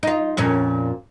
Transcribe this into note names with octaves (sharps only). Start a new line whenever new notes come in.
D#4 F4
F2 A#2 C#4